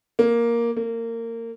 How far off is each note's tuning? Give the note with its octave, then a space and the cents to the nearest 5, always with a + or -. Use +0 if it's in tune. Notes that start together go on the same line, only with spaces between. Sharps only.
A#3 +5
A#3 -25